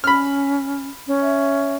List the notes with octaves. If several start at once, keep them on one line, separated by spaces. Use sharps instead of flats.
C#4 B5 F6
C#4
E5